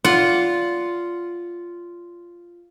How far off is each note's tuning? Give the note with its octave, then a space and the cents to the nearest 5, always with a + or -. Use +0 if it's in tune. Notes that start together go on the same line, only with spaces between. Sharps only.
F4 -5 D5 -25 F#5 +0